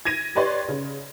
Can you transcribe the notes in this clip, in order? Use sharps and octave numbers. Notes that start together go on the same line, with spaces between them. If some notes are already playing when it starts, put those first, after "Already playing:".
G#6 A#6 D#7
G4 B4 C#5 D5 C6
C#3